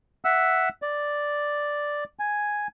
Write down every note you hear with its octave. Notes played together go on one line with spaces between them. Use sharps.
E5 F#5 E6
D5
G#5